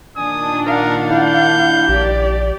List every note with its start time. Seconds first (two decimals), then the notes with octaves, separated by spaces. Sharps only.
0.17 A#2 D#3 D4 G#5 D#6
0.66 A#4 F5 F#5
1.11 E4 G6
1.89 A#1 G4 D5